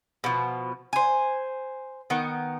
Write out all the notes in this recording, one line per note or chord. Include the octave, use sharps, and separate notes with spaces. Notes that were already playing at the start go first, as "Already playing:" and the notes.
B2 F3
C5 G#5
D#3 B3